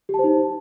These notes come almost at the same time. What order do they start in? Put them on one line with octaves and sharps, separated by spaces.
G4 A5 C5 D#4